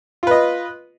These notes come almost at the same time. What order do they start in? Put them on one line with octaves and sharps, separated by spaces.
F4 B4 D#5